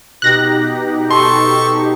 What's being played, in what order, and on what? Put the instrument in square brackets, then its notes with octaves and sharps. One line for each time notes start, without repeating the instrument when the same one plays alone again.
[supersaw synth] B2 D#4 G4 [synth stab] F#6 A#6
[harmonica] A4 C#6 [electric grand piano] C6